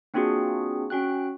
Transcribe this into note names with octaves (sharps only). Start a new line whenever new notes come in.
A#3 C4 D4 F4 F#4 G#4
C#4 F#4 G5 F#6